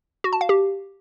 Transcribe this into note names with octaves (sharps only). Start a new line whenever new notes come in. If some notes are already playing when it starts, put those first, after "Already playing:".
F#4
A5
F5
G4